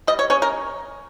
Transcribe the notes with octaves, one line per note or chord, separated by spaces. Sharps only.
G3 D#5
C#5
C#4 C#5
A#4